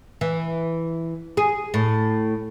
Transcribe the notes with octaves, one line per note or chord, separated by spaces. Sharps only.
E3
G#4
A2